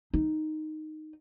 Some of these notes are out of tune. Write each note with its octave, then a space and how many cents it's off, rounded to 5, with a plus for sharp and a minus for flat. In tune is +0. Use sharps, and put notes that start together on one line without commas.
D#4 -5